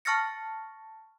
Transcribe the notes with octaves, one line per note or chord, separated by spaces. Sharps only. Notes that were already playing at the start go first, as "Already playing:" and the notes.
A5 C#6 F6 A6 A#6 C#7